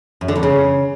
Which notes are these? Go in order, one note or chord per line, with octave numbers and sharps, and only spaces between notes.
F#2
D3
F2
C#3